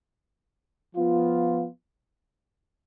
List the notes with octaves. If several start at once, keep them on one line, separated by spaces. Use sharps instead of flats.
F3 B3 F4